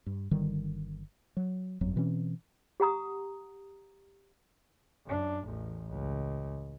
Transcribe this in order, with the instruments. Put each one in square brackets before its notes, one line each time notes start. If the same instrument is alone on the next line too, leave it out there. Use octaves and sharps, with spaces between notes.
[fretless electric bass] G2
G1 D3 D#3 G3
F#3
G1 F2 F#3
B2 E3 C4 C#4
[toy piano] G4 F#5 A#5 D#6
[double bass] F#2 D4
A1 E2
C#2